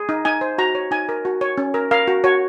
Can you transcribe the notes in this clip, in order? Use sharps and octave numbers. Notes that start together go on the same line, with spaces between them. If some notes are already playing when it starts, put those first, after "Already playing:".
Already playing: G#4
D#4
D#4 G#5
C5
F#4 A#5
C#5
D#4 G#5
A#4
F#4
C#5
C#4
A#4
A#4 F5
F#4
F#4 C#5